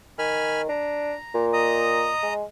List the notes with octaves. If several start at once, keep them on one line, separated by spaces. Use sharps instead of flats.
D#3 G#5 B5 F6
D4 A#5
A#2
D#5 A#5 D#6
G#3